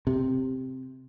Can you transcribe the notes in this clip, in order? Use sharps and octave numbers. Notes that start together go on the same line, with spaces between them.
C3